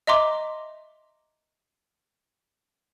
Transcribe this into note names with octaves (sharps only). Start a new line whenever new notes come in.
D#5 E5 A#5 C6 D6